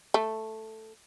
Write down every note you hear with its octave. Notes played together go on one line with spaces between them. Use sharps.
A3